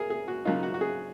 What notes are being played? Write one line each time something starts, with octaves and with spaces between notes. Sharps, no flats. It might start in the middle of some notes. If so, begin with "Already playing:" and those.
Already playing: G#4 A#4
G#4
F#4
C#3 F#3 A#3 D#4 F4
F#4
F#4
G#4